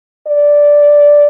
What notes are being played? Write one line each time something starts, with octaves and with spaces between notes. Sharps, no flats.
D5